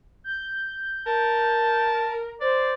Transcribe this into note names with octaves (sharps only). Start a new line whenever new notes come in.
G6
A#4 A5
C5 D5